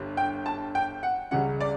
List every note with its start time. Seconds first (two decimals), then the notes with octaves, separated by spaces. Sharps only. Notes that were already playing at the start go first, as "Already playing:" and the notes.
Already playing: G1 G2 G3
0.17 G5
0.46 A5
0.75 G5
1.03 F#5
1.31 C#2 C#3 G3 C#4 F#5
1.60 D5